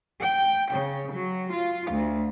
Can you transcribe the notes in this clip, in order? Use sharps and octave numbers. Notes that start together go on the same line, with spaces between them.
G5
C#3
F#3
F4
D2